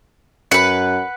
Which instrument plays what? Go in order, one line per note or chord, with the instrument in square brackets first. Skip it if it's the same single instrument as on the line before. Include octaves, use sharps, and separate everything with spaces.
[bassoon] F#2 [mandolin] B4 F#5